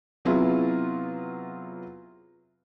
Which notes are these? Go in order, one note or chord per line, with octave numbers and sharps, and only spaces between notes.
C3 F#3 B3 E4 F4 G#4